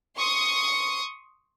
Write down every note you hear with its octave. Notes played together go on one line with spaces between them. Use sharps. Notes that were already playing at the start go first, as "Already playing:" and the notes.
C6 C#6 D#6